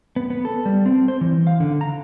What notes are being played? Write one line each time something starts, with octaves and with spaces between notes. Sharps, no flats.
B3
B3
A4
G3
C4
C5
E3
F5
D3
A#5